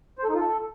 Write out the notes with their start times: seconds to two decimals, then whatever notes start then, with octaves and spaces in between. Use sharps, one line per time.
0.18 C5
0.24 A4
0.29 D#4
0.35 F4
0.40 A4